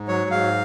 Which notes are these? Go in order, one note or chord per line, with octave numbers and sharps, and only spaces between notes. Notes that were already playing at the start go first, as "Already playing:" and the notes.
Already playing: G#2
F#3 C#5
G#2 F5